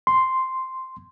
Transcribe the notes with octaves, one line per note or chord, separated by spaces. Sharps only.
C6